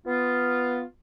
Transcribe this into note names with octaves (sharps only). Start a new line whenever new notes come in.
B3 F4